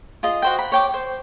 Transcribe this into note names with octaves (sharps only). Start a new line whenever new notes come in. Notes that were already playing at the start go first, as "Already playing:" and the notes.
F4 G#4 D#5
F#4 C5 G5
B5
C#5 G5 D6
C5